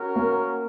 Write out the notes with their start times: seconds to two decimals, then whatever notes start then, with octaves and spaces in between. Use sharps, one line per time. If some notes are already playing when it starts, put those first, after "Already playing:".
Already playing: C#4 F#4 A#4
0.16 A#3